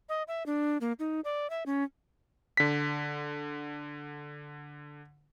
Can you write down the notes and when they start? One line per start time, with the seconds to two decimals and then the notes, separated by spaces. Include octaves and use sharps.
0.09 D#5
0.28 E5
0.46 D4
0.81 A#3
0.99 D#4
1.24 D5
1.50 E5
1.66 C#4
2.57 D3 B6